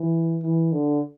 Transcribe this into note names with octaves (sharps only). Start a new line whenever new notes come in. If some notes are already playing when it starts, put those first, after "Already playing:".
Already playing: E3
E3
D3